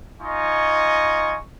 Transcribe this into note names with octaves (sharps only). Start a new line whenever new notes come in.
D#4 F4 D#5 G#5 C#6